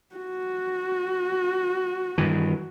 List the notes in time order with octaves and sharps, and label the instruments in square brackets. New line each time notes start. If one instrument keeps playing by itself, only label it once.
[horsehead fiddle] F#4
[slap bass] G2 D#3 E3